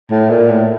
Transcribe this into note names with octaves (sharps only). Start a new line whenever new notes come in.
A2
A#2
A2